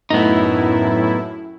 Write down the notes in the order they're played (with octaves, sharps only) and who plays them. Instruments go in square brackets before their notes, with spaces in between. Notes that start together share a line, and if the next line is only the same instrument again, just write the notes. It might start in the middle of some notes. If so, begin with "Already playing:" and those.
[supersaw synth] F#2 A2 E4 [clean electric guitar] B3 D#4